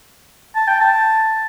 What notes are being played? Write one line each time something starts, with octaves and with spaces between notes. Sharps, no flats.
A5
G5
A5